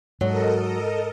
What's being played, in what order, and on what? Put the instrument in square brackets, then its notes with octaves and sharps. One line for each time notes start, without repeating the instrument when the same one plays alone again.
[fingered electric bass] G#2 [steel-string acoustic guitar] F#3 [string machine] A4 A#4 D#5